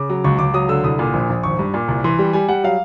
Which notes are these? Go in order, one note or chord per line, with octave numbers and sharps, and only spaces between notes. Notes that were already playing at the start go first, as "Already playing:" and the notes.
Already playing: C#3 D6
F#3
C#2 C#6
C#2 D6
F#3 D#6
D3 E6
C2 D#6
A#2
A#1
A#1
G#1 C#6
G2
A#2
C2
E3 C6
G3
G3 G#5
G3 F#5
F#3 F5